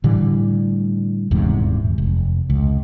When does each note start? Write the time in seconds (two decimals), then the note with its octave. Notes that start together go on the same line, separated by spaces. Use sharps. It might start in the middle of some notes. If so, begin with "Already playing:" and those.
0.04 A2 D3 E3 G3
1.31 D#1 E2 G#2 C3
1.98 F1
2.50 C#2